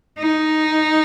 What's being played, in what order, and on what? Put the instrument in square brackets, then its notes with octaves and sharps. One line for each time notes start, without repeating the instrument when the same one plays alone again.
[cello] D#4